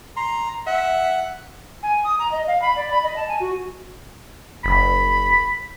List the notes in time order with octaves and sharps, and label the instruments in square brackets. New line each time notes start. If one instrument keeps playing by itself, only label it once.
[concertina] A#5 [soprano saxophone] C6
[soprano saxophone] E5 [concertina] F#5
[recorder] G#5
D#6
A#5
D#5
F5
B5
D5
B5
D#5
A5
G#5
F#4
[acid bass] F#1 [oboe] B5